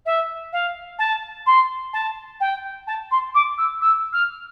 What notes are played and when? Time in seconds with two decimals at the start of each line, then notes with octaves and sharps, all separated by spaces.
0.05 E5
0.52 F5
0.99 A5
1.46 C6
1.93 A5
2.40 G5
2.87 A5
3.11 C6
3.34 D6
3.57 E6
3.81 E6
4.13 F6